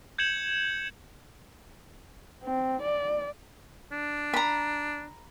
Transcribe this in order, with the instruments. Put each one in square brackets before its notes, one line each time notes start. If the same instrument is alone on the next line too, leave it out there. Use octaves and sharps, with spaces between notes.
[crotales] G6 G#6 C#7 E7 F#7
[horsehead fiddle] C4
D5
[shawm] D4
[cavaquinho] A#5 B5